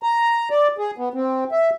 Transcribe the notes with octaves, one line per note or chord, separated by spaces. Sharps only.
A#5
D5
G#4
B3
C4
E5